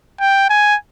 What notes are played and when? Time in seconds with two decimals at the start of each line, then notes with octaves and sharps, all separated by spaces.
0.20 G5
0.50 G#5